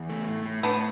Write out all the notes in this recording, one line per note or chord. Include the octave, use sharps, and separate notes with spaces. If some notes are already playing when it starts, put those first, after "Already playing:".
Already playing: E2
A3
A2
A2
A2 B3 D4